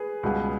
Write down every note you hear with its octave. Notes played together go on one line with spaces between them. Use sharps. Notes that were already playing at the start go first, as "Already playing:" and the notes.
Already playing: G#4 B4
C#2 B2 G3 B3